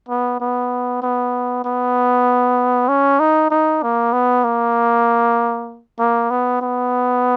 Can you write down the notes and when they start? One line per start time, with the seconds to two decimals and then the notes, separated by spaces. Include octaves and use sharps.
0.09 B3
0.41 B3
1.02 B3
1.65 B3
2.89 C#4
3.20 D#4
3.51 D#4
3.83 A#3
4.13 B3
4.44 A#3
5.99 A#3
6.30 B3
6.62 B3